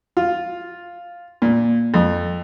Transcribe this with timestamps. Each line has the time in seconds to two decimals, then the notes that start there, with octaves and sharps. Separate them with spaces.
0.17 F4
1.42 A#2
1.94 F2